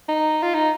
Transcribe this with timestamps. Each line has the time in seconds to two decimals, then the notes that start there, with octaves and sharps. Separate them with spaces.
0.08 D#4
0.43 F4
0.55 D#4